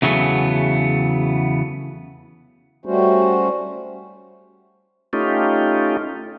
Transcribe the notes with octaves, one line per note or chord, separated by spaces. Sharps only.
E2 C#3 F#3 A3 B3
G3 A3 C#4 F#4 C5
A3 C#4 D#4 F4 G4